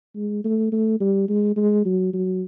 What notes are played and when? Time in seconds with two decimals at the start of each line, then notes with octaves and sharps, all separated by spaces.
0.16 G#3
0.44 A3
0.72 A3
1.00 G3
1.29 G#3
1.56 G#3
1.85 F#3
2.13 F#3